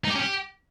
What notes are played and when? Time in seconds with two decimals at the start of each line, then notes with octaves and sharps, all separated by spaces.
0.04 D#4
0.10 G4
0.15 C#4
0.20 G4